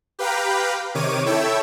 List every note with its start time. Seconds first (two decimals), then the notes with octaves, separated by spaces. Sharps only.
0.19 G4 B4 F5 G5 A#5 B5
0.95 C3 D#3 C#5 D6 D#7
1.26 E4 A4 C#5 E5 G5 E6